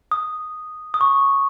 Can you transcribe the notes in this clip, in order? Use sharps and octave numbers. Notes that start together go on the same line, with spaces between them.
D#6
D#6
C#6